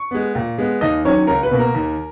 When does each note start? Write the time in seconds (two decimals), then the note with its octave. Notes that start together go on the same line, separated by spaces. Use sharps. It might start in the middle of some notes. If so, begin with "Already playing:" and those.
Already playing: C#6
0.11 G#3 B3
0.35 A#2
0.58 G#3 B3
0.81 D#2 D#5
1.04 D#3 F#3 C#4 C#5
1.27 C#2 A#4
1.43 B4
1.51 B2 A#3
1.59 A#4
1.74 D#2